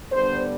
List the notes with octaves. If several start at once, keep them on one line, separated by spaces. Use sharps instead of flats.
D3 G3 B3 D4 C5